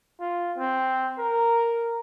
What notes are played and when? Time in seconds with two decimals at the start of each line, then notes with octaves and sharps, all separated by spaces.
0.21 F4
0.58 C4
1.18 A#4